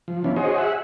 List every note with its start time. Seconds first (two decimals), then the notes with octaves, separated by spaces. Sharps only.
0.08 F3
0.24 E3 B3 C#4 D4 F4
0.36 F#4 G#4 C5 C#5 D#5
0.58 G#4 E5 F#5